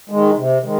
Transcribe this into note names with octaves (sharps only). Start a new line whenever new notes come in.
D#3 G#3
C3
D#3 G#3